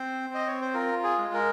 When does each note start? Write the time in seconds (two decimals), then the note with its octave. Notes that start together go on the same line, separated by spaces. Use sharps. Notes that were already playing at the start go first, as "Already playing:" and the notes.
Already playing: C4 C5
0.30 C4 D#5
0.47 C#5
0.62 C5
0.74 F4 A#4
1.04 G#4
1.18 G#3
1.34 A#4